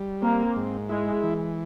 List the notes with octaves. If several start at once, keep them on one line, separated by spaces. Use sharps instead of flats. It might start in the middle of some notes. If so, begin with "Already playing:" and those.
Already playing: G3
A#3 C4
G#2
G#3 E4
E3